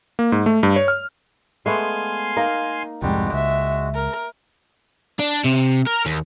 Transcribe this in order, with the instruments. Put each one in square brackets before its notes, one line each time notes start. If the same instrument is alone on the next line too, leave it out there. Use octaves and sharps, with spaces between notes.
[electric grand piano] A#3
G#2
A3
G2
C#5
F6
[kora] G#3 A3 B3 [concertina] F5 G#5 C6
[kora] A#3 D#4 A#4
[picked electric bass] C2 F2 G#2 [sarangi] G3 [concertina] G#3 F#4
[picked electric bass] C#2 [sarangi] E5
[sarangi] A#4
[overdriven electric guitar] D4
C3
A#4
D#2